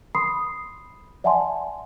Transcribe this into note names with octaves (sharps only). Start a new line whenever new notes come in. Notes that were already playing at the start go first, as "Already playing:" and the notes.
B5 C6 D#6 C7
D5 E5 F#5 G#5 A5 C6